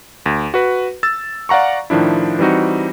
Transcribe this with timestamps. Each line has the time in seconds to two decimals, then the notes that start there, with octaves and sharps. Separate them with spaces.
0.26 D2
0.54 F#4 B4
1.03 E6 A6
1.49 D5 F5 F#5 A#5 C#6
1.90 A2 D#3 F3 D4 E4
2.39 E3 G3 C4 D#4 F#4